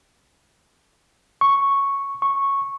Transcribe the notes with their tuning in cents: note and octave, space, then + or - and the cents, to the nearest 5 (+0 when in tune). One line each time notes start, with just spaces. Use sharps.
C#6 -5
C#6 -10